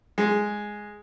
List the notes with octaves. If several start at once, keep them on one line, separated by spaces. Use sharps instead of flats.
G#3